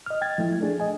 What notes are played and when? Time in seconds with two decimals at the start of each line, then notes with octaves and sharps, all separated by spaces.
0.06 D#5 F6
0.21 G5 G#6 A6
0.38 F3 A3 E4
0.61 A3 D4 G#4
0.80 D#5 G#5